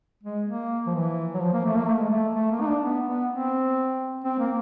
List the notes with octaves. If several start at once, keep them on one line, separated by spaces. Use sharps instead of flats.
G#3
A#3
F3
E3
F#3
F3
A#3
A3
A#3
A3
G#3
A3
A3
A#3
D#4
D4
B3
B3
C4
C4
A#3